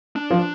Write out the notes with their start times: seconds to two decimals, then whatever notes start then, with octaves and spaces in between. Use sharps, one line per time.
0.16 D4
0.31 F3